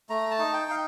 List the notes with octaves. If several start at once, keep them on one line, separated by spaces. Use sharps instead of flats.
A3 A#5
A5
D#4
G5
D#4 F5